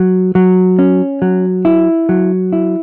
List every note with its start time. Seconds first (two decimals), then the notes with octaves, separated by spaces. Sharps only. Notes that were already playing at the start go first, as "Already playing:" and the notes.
Already playing: F#3
0.35 F#3
0.79 C#4
1.22 F#3
1.65 E4
2.09 F#3
2.53 E4